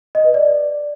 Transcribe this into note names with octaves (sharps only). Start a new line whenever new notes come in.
D#5
B4
D5